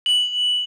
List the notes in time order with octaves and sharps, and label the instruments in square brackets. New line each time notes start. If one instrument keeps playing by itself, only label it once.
[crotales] F#7